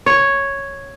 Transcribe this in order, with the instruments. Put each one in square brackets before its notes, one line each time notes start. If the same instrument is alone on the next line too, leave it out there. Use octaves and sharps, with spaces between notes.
[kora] C#5